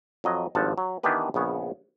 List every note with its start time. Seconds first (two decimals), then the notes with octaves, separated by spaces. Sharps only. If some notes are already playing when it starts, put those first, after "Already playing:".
0.24 F2 F#3 D#5
0.55 G#1 G2 F3 F#5 A5
0.78 F#3
1.03 D#3 E3 B3 D4 G4 B4
1.34 A#1 C#3 B3 C#5